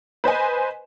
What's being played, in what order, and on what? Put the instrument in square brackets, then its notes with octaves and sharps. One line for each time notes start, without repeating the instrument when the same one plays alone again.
[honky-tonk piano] B4 C5 D#5 G#5